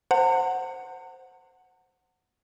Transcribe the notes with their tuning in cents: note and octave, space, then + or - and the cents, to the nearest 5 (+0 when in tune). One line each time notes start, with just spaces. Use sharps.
C5 +0 F#5 +0 A#5 -45